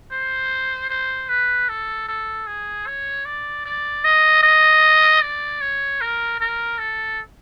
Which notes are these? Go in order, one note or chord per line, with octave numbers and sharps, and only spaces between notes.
C5
C5
B4
A4
A4
G#4
C#5
D5
D5
D#5
D#5
D5
C#5
A#4
A#4
A4